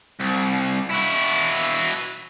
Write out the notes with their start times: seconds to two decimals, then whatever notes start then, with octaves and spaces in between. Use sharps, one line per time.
0.20 C2
0.91 E4 F#4